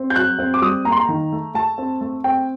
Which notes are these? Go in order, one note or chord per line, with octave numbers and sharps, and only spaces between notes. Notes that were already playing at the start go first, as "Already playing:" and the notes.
Already playing: C4
G6
F#3 F#6
C4
D6
G3 D#6
A#3 A#5
C6
A#5
D#3
A3
A3 A5
C4
A3
C4 G5